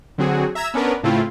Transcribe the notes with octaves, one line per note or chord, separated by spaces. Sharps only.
D3 F#3 C4 F#4 G#4
E5 A#5 E6 G#6 E7
B3 C#4 D4 A#4 B4
A2 C#3 A3 C4 E4 F4